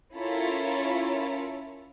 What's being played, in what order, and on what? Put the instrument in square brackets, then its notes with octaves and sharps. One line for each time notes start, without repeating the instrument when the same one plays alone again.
[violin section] C#4 E4 F4 A4 A#4 C#5